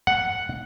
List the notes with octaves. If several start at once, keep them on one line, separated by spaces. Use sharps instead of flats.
F#5